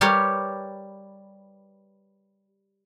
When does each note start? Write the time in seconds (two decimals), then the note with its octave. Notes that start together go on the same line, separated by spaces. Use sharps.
0.01 G3 G4 A#4 B4 C#5